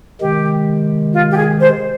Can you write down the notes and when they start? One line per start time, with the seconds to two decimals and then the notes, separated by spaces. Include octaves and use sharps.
0.20 C3 D#3 G#3 G4
1.13 F4
1.31 G4
1.37 G#4
1.60 C5